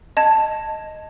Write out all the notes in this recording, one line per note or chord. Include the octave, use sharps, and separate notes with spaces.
D#5 A5 G#6